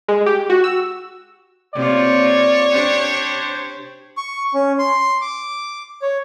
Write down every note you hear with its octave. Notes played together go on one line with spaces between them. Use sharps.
G#3
G4
F#4
E6
C3 A#3 F4 C#5 D5
D4 G4 C5
C#6
C#4
C6
D6
C#5